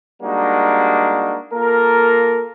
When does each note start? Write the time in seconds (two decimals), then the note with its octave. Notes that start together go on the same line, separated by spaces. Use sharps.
0.22 G3 G#3 A#3 D4 D#4 F#4
1.53 A#3 F4 A4 A#4